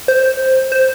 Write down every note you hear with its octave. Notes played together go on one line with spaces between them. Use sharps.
C5
C5